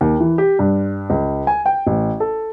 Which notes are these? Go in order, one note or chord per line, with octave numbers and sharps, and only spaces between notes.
D#2
E3
G4
G2
C#2
G#5
G5
A1
A4